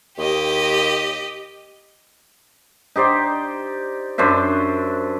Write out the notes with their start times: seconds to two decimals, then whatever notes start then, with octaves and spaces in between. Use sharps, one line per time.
0.18 D#2 G4 D#5
2.96 D#4 G4 C5 D5
4.18 F#2 D4 C5 E5